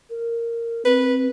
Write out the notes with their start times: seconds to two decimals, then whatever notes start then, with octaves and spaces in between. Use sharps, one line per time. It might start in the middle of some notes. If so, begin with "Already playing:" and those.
0.10 A#4
0.85 C4 B4